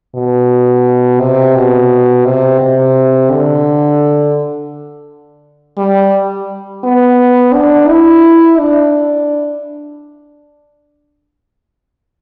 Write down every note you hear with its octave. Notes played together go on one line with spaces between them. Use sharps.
B2
C3
B2
C3
C3
D3
G3
B3
D4
E4
D4